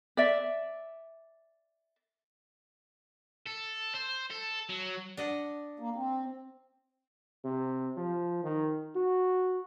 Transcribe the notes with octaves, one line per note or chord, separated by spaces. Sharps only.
D5 E5
A4
C5
A4
F#3
D4 D#5 F#5
A#3
C4
C3
F3
D#3
F#4